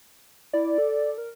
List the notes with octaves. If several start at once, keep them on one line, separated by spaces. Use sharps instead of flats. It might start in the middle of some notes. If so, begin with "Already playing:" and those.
E4 D5
A4
A#4